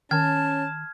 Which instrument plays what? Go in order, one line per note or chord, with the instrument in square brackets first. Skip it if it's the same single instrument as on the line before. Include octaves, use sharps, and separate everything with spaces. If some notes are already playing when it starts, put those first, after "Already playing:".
[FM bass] D#3 [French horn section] C#4 [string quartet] A5 [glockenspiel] F6 G#6